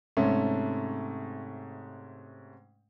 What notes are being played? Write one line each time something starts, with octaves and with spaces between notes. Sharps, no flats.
G#2 C3 A3 C#4